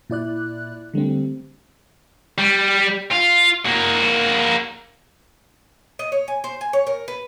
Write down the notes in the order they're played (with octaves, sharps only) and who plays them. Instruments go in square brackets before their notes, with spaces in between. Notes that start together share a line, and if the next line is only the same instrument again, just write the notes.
[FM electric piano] A#2 E4 D5 F#6
D3 G3 A3 C4
[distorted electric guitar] G3
F4
A#3 F#4
[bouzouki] D#5
C#5
G#5
C5
G#5
C#5
A#4
B4